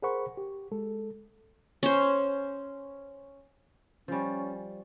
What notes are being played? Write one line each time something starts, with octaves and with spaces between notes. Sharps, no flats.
G#4 A#4 C5 F#5 B5 C#6
G4
G#3 A4
C#4 C5
F3 G3 C#4